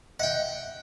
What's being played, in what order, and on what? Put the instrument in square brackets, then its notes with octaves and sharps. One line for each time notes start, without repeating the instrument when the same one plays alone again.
[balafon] D#5 E5 [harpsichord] F#5 G5